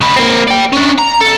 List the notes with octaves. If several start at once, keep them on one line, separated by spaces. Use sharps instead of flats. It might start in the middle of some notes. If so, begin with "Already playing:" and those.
C#3 B4
A#3 C4
D5 G5
C#4 D4
A#5
B1 A4